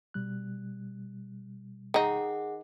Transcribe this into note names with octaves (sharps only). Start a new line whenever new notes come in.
B2 G3 F#6
D#3 D#4 G#4 F#5